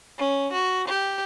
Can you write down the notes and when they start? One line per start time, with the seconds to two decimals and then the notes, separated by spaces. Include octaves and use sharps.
0.18 C#4
0.52 F#4
0.88 G4